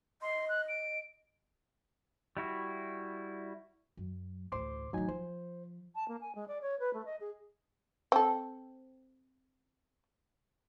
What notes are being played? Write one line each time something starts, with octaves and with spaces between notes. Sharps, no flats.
D#5 C6
F#6
D7
G3 E4 F#4
F#2 F#3
A1 D2 C5 C6 D6
A2 D#3 F#3 D#4 G#5
F3 C5
A5
A#3
G#5
G#3
D5
C#5
B4
A3
D#5
G#4
C4 A4